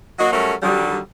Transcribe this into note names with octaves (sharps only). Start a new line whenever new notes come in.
F#3 A#3 F#4 D#5
F#3 G3 A3 C#4 A4 A#4
D3 D#3 F#3 G3